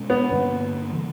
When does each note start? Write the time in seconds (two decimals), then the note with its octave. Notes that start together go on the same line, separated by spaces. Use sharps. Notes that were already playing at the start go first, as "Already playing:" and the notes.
Already playing: B2 G#3 C#4
0.10 B3
0.31 G2 D3 G3 A#3
0.93 C#3 E3